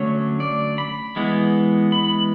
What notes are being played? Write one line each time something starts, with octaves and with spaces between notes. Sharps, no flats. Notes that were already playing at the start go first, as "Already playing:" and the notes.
Already playing: D3 F#3 A3 C#4 C#5
D5
B5
E3 G#3 B3
B5